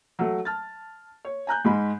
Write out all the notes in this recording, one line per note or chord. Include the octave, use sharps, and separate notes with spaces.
F#3 A3
A5 F6 A6
C#5
G#5 A#5 F#6 G6
G#2 G#3 B5